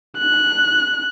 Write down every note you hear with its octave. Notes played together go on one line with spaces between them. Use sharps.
F#6